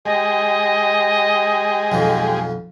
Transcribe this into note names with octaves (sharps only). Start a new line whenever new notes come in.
G#3 G4 G#4 D#5
B1 F2 F3